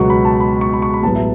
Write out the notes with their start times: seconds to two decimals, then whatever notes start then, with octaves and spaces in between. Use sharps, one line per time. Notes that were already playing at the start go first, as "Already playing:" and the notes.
Already playing: C#2 B2 F#3 B3 C#6
0.10 B5
0.25 A5
0.40 B5
0.61 C#6
0.73 B5
0.82 C#6
0.94 B5
1.03 A1 A2 F#3 B3 A5
1.15 E5